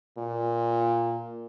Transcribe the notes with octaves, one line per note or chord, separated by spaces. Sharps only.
A#2